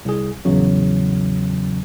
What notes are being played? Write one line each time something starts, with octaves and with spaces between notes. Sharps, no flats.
C2 G#4
A#1 E2 C#3 F#3